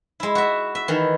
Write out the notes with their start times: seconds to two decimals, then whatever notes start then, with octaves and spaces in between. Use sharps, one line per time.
0.20 G#3 E4
0.35 F#4 E5
0.75 E5
0.88 D#3 E3